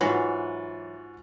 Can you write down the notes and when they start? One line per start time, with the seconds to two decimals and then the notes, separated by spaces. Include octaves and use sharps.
0.01 G#2 E3 F#3 F4 F#4